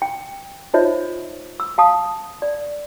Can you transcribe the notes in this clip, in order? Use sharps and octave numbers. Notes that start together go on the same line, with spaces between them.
G5
D#4 F4 C5 C#5 D#5 E5
E6
F5 A5 D#6
D5